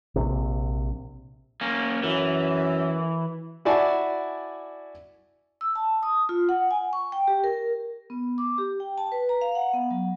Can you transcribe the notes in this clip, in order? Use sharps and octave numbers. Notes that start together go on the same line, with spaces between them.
A#1 C3
A#3 C#4
F#2 E3
E4 F#4 D5 G#5 A5
E6
A5
D#6
F4
F#5
G#5
C#6
G5
G4
A#4
B3
D6
G4
G5
A5
B4
A#5
F5
F#5
B3
F#3